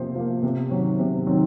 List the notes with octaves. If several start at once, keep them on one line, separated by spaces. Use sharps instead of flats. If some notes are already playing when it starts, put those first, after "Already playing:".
Already playing: C3 F3 A#3 C5
F3 A#3
C3
D#3 F#3 C4
C3
D#3 F#3 C4